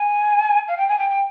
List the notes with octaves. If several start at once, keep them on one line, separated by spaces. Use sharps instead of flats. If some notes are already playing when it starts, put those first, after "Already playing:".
Already playing: G#5
F5
G5
G#5
G5
G5